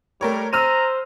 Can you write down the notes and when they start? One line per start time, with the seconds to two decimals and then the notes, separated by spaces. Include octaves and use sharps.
0.21 G3 A3 A#4 C#5
0.53 C5 A#5 E6 F6 D#7